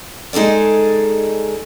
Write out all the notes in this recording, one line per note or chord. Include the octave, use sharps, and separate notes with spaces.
G#3 D#4 G#4 A4 D5